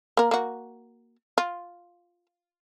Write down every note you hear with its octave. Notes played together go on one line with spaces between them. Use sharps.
A#3 A#4
A#3 F#4
F4